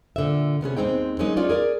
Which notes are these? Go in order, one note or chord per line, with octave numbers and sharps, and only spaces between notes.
A#2 D3 D#3 E5
C3 B3 C#4 G#4
D#2 G#3 C4 D#4 G5
F#3 G#3 A#3 C#4 D#4
C#4 D#4 F4 G#4 D5
G#4 A#4 D5